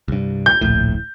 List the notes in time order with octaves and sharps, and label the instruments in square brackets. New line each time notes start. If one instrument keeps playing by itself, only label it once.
[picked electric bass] C2 G2
[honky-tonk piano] G6
[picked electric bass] D1 A#1 A2